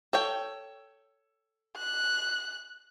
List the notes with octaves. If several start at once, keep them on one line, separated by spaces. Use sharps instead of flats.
A4 C#5 G5
F#6